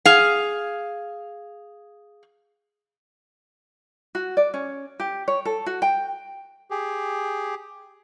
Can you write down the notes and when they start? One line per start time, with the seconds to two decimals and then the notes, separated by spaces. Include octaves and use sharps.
0.05 G#4 F5
4.15 F#4
4.37 D5
4.54 C#4
5.00 G4
5.28 C#5
5.45 A4
5.66 F#4
5.82 G5
6.71 G4 G#4